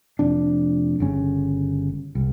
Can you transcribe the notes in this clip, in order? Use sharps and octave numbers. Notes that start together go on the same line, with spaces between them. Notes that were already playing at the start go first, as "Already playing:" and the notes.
F1 F2 D4
G1 C#3 C#4
C2